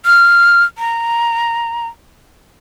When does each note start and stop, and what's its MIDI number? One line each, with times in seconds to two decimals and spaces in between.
0.06 0.63 89
0.78 1.87 82